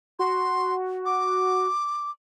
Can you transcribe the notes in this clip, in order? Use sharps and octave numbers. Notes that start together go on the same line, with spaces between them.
F#4 C6
D6